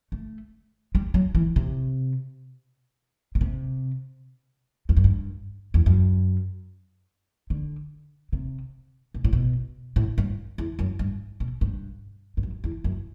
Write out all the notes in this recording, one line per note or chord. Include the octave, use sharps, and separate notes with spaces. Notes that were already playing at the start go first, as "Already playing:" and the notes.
A3
G3
F#3
E3
C3
B2
C3
E2
F#2
G2
E2
F#2
D3
C3
B2
A2
B2
A2
G2
E2
F#2
G2
B2
G2
G2
F#2
E2
F#2